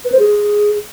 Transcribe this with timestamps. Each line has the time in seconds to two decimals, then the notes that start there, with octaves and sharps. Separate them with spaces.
0.05 B4
0.12 C5
0.19 G#4